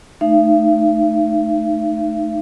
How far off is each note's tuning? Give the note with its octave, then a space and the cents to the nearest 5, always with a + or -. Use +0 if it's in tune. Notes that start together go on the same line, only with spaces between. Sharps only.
A3 -5 D#4 -15 E5 +45